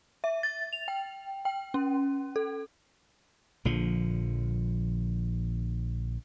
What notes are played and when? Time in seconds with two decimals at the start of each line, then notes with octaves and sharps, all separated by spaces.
0.24 E5
0.43 A6
0.73 F7
0.88 G5
1.45 G5
1.74 C#4
2.36 A4
3.65 A#1 D3 F3